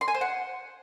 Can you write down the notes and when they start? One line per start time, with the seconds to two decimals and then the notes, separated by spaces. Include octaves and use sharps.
0.01 C6
0.08 G#5
0.14 C5
0.21 F#5